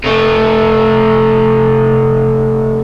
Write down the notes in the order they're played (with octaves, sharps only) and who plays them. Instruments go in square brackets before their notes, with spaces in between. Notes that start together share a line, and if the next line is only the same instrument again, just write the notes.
[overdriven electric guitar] C3 A3